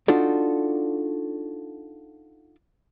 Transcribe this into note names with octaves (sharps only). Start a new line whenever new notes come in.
D4 D#4 F4 F#4 A4 D5